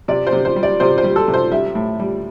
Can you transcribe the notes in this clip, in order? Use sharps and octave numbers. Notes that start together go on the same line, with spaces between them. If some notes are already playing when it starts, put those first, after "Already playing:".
C3 D5
C5
C3
C5
G3
D5
C3 C5
C5
G3
A4
C3
C5
G3 E5
A2
G3